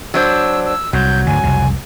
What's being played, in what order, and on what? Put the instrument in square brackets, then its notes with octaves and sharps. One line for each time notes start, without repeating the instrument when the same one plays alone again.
[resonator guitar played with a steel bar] F#3 D4 C5 [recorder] E6
[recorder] E6
[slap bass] C2 [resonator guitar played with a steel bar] F#3 [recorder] G6
[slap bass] D2 G#2 D3 [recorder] G#5
[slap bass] C2 F2 C#3